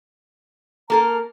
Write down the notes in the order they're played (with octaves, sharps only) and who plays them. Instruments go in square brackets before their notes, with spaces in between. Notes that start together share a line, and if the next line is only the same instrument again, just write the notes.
[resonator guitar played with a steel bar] A#3 A4 A#4 [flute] A#5